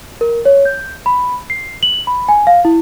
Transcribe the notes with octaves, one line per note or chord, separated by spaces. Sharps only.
A#4
C#5
G6
B5
C7
F#7
B5
G#5
F5
E4